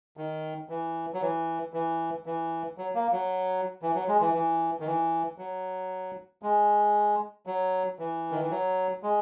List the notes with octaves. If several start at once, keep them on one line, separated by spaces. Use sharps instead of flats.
D#3
E3
F#3
E3
E3
E3
F#3
A#3
F#3
E3
F#3
G#3
E3
E3
D#3
E3
F#3
G#3
F#3
E3
D#3
E3
F#3
G#3